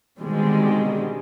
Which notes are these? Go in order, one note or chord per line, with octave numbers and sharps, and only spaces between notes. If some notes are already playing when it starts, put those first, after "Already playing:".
B2 D3 D#3 G3 G#3 C4